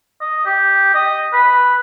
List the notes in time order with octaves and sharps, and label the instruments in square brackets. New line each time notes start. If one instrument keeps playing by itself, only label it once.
[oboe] D#5
G4
D#5
B4